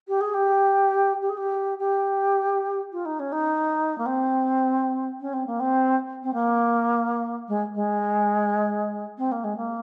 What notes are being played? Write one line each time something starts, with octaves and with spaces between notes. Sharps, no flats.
G4
G#4
G4
G4
G#4
G4
G4
F4
D#4
C#4
D#4
A#3
C4
C#4
C4
A#3
C4
C4
A#3
G#3
G#3
C4
A#3
G#3
A#3